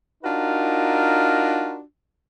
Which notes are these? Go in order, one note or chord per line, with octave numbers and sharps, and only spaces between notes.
D4 D#4 F4 F#4 A#4